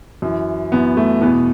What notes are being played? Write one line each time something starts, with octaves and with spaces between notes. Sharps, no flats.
F#2 E3
F#2 E3 B3
A3
E2 B2 B3